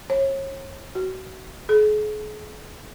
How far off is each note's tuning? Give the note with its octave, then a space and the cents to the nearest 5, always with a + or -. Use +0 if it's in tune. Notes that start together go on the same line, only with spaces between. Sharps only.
C#5 -35
F#4 +30
G#4 +40